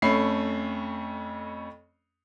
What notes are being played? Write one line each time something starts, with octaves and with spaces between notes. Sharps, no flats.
F2 A3 C#4 B5 C7